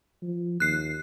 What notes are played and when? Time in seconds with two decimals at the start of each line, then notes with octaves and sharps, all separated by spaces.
0.23 F3
0.60 D#2 F#6 C7